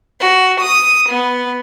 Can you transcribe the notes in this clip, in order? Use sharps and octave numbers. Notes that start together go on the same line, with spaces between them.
F#4
D#6
B3